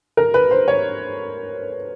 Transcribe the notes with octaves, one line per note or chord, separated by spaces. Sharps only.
A#4
B4
C5
C#5